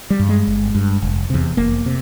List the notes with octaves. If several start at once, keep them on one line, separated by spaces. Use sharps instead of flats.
G3
G2
G#3
G1
G2
F1
E2 C3
F1 A#3
C3